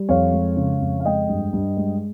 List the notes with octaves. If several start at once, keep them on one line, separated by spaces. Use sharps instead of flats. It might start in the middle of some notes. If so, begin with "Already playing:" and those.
Already playing: G3
F2 C#5 F5
G#3
C#3
F2
F5
G#3 D#5 G5
G2
G2
G#3